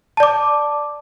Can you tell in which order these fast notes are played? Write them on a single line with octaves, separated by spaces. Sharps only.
A5 D5 D6